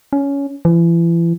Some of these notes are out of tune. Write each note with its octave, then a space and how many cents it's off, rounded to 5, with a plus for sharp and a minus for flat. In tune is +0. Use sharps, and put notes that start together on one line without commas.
C#4 +15
E3 +35